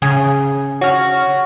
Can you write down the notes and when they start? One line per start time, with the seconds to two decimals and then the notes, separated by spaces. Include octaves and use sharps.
0.02 C#3 G#4
0.81 F#4 C#5 F6